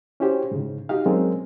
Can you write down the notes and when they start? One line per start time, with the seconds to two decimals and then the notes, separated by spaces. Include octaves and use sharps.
0.20 C#4 E4 F#4 G4 C5
0.52 G#2 C#3
0.89 D#4 F#4 G4 F5
1.06 F#3 G#3 C4 C#4 A#4